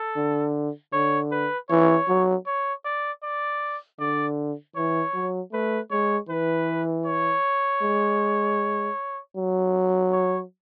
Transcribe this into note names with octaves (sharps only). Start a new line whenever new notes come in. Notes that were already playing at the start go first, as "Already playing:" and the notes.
Already playing: A4
D3
D3 C#5
B4
E3 C#5
F#3
C#5
D5
D5
D3 D5
E3 C#5
F#3
A3 B4
G#3 C#5
E3 B4
C#5
G#3
F#3
C#5